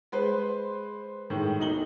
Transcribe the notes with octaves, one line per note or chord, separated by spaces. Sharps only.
G#3 B4 C5
A2 D#3 G#3
B1 D#4 F#7 G7